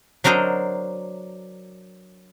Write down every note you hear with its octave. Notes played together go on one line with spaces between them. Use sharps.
F#3 D4 A#4 C5 D#5